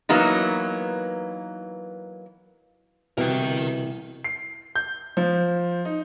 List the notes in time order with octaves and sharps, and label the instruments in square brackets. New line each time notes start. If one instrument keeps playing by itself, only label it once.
[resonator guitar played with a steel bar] E3 F#3 A#3 B3 D#4
[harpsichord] C2 [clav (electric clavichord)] B2 [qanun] E3 [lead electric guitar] A#4 G5
[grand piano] C7
G6
F3
D#4